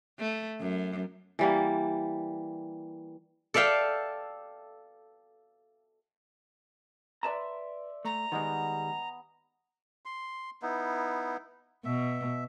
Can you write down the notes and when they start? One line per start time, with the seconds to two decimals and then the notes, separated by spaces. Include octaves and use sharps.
0.20 A3
0.60 F#2
1.39 E3 G3 A#3
3.54 A4 D5 E5 F5 G5
7.23 B4 D5 E5 A5 A#5 C6
8.05 A3 A#5
8.32 D#3 G3 G#3 B3 D#5 G#5
10.05 C6
10.62 B3 D#4 E4
11.85 B2 E5